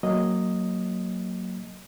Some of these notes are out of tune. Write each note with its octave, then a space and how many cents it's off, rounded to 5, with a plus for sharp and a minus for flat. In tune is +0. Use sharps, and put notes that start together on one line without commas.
F#3 +0 A#3 -15 D#5 +0